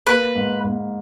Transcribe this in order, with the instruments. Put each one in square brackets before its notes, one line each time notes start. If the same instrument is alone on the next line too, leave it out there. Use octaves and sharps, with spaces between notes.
[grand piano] A#3 [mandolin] B4
[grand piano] G#2
G#2